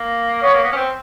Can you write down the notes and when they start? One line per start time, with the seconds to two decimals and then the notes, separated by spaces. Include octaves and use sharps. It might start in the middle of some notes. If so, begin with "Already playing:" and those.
Already playing: A#3
0.43 B3 C#5
0.54 A#3
0.64 B3
0.73 C#4
0.77 C4